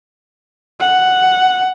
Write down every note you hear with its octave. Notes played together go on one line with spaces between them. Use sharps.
F#5